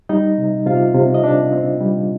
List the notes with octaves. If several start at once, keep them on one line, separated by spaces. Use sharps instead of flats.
G3 D#4 D#5
C3
C3 F4 F5
C3
D#5
C3 D4 D5
C4
G3